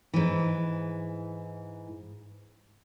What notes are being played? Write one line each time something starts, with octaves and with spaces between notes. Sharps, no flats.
G#2 E3